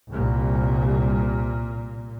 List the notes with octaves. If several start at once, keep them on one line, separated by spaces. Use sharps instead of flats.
C2 A#2